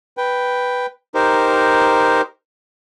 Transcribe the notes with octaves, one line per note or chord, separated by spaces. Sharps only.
B4 G5
D#4 G4 A#4 C5